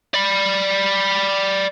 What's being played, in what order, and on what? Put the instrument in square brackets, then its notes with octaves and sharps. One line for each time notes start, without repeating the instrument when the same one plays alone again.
[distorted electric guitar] D5 B5